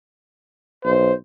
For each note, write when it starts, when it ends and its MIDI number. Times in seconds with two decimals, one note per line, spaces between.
0.85 1.12 35
0.85 1.13 72